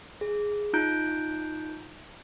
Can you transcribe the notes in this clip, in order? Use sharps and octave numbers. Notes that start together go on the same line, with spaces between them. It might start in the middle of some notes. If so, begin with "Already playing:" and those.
G#4
D#4 F4 A#5 F#6 G6 D7